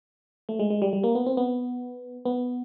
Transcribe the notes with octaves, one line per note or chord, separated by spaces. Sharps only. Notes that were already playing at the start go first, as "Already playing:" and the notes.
A3
G#3
G#3
G3
G3
A#3
B3
C4
B3
B3